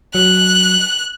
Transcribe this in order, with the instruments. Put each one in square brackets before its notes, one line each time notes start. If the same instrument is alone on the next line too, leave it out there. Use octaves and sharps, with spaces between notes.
[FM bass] F#3 [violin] F#6